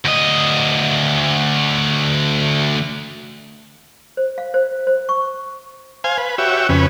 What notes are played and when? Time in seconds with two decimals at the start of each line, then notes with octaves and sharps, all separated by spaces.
0.04 D2 D#5
4.17 C5
4.38 F5
4.54 C5
4.87 C5
5.09 C#6
6.04 C5 F5 G#5
6.18 B4
6.38 F#4 G4 C#5 E5
6.69 F2 C#3 C#4 B4